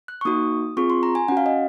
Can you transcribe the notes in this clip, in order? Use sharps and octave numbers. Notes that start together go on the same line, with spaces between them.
F#6
C#6
A#3 D#4 F#4 D#6
C4 F4 G#4 C#6
C6
A#5
G#5
C#4 F#4 F#5
F5
D#5